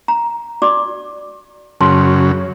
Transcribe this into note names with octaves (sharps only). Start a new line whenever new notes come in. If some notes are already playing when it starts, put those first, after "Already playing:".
A#5
F#4 D5 D6
F#2 C#3 A5 C6